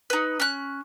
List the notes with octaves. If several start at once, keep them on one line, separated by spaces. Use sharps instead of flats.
D#4 B4
C#4 F#6